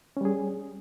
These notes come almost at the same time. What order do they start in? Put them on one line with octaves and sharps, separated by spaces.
C#4 G3 G#4